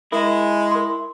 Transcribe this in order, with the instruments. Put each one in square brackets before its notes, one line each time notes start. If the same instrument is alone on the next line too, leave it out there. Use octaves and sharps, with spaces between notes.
[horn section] G#3 [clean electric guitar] E4 [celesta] A#4
[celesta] A#4 C6